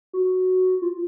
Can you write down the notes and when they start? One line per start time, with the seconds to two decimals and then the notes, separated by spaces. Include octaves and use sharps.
0.13 F#4
0.82 F4